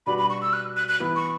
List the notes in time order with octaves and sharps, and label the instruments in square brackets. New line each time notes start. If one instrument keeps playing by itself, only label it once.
[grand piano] B2 G3 D4 F#4 B4 [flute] B5
[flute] B5
C#6
E6
F#6
F#6
F#6
[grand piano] E3 B3 E4
[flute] C#6